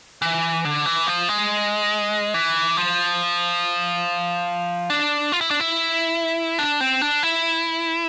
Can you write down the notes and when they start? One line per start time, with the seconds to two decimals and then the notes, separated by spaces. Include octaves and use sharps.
0.22 E3
0.65 D3
0.86 E3
1.07 F3
1.29 G#3
2.34 E3
2.77 F3
4.90 D4
5.32 F4
5.41 E4
5.51 D4
5.60 E4
6.59 D4
6.80 C4
7.02 D4
7.23 E4